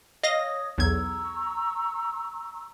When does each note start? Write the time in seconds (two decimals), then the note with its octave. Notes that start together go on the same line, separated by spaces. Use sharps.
0.23 C#5 D#5 F5 D#6 A#6
0.78 B1 E2 A#5 C#6 E6 G#6